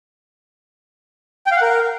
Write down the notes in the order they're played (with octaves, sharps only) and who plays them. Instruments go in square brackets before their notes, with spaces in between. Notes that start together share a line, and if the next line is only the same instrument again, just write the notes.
[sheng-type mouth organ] G5
F5
F#5
A#4